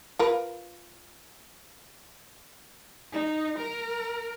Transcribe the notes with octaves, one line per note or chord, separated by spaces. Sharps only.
F4 A#4 B4
D#4
A#4